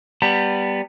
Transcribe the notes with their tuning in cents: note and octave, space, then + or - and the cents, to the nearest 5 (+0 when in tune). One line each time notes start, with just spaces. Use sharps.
G3 +0 B3 +0 A#5 -45